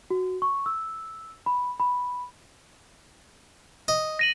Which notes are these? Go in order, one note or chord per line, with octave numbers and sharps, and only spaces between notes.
F#4
C#6
E6
B5
B5
D#5
A#6 D#7 F#7